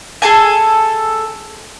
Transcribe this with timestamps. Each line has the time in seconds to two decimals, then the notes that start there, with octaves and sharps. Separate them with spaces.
0.22 G#4 A4 G#5